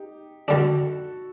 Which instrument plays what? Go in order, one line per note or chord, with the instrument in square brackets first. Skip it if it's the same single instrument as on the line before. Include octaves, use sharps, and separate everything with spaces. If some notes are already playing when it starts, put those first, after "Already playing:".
Already playing: [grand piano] D#4 G4
[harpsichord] D3 G3 D4 [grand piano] F#4 A4